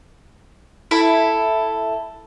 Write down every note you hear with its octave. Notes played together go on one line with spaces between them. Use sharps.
E4 A4 B5